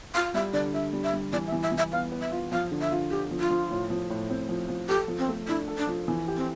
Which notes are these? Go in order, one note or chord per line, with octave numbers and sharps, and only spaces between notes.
F4 F5
G3 E5
D3 D5
D3 E5
G3
E5
G3
E3 D5
E5
E3
E5
E3
E5
B3 F5
B3
E5
F4
F3 F5
D3
E5
F4
D3 G4
F3
F4
F3
A2
F3
A2
C4
F3
F3
G4 A4
F3
C4
A3
D4 E4
A4
D4
F3
E3
G4
C4